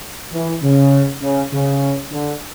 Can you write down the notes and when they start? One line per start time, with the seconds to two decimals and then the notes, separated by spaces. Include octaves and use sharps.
0.33 E3
0.63 C#3
1.22 C#3
1.53 C#3
2.12 D3